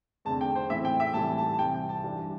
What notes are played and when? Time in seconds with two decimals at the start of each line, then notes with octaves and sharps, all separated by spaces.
0.25 E2 D3 A3 C4 A5
0.41 G5
0.56 C5
0.69 A2 E3 C4 E4 E5
0.85 G5
1.00 E5
1.14 A2 E3 G3 C4 A5
1.38 A5
1.54 A5
1.59 C2 C3 E3 C4 G5
1.74 G5
1.89 A5
2.04 G2 E3 G3 D4